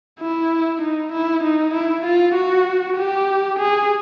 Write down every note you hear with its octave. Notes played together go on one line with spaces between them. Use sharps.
E4
D#4
E4
D#4
E4
F4
F#4
G4
G#4